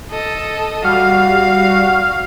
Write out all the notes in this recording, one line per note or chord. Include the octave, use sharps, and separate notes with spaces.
A4 D#5
G3 F#4 F5 F6